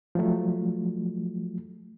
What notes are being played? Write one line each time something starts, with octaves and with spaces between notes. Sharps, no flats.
F3 F#3 A3